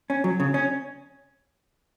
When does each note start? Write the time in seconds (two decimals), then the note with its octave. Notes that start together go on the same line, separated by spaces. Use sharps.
0.10 C#4
0.24 F#3
0.40 C#3
0.54 C#4